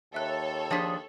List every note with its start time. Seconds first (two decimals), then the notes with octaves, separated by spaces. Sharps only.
0.14 D#2 A4 C#5 E5 F#6
0.71 F3 D4 G#4 A5 B6